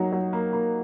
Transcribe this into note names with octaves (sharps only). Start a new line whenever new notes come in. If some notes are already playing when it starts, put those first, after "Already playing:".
Already playing: F#3 A#3 D#4
F#3
A#3
A#3